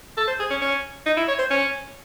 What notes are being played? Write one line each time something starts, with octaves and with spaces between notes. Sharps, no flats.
A4
C5
G#4
C#4
C#4
D#4
E4
C#5
C5
C#4